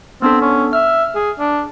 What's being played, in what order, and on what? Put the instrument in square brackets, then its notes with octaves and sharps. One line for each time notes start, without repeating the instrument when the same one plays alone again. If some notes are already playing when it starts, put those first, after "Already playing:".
[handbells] B3 D4 A4 [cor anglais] C4
[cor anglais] C#4
[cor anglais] E5 [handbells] F6
[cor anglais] G#4
D4